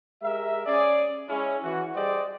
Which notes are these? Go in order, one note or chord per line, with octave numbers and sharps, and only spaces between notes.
G#3 G4 A#4 E5
C#4 G#4 D5
G#3 C#4 E4
E3 F#4
G3 G#4 C5 D5 D#5 G5